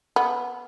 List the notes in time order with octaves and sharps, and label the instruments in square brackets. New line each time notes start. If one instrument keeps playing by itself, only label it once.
[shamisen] B3